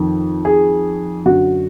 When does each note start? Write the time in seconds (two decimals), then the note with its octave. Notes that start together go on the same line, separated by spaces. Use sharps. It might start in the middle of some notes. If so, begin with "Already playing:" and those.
Already playing: F2 D#3
0.45 G#4
1.25 F#2 D3 F#4